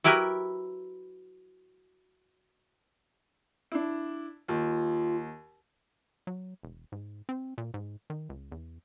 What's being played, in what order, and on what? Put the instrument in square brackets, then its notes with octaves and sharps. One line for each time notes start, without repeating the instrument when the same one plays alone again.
[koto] F#3 E4 G4 A#4 B4
[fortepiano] D4 E4
[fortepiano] D#2 [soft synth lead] F4
[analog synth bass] F#3
E1
G#2
C4
A#2
G#2
D#3
C#2
E2